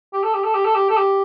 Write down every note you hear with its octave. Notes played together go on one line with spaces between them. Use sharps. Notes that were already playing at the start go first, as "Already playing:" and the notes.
G4
A4
G4
A4
G4
A4
G4
A4
G4